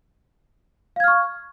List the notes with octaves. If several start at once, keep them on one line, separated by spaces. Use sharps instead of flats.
F5 C#6 F6 G#6